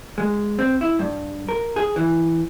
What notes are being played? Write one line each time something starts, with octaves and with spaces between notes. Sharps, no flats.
G#3
C4
E4
G2
A#4
G#4
E3